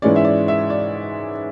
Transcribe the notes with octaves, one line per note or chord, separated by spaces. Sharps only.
G#2 E3 G#3 C#4 D5
E5
D5
E5
D5